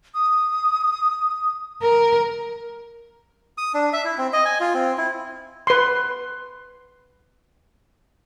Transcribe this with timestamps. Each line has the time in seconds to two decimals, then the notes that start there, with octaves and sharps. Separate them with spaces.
0.14 D#6
1.82 A#4
3.58 D#6
3.74 D4
3.93 E5
4.05 E4
4.18 C4
4.33 D#5
4.45 G#5
4.60 F4
4.74 C4
4.98 E4
5.67 B4 C6